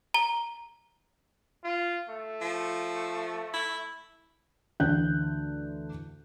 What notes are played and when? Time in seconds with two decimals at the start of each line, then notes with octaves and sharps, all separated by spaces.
0.14 A#5 G7
1.64 F4
2.09 A3
2.41 F3
3.54 E4
4.80 D2 D3 E3 F#6 G6